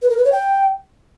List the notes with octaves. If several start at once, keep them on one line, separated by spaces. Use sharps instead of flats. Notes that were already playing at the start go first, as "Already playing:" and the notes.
B4
A#4
B4
C#5
G5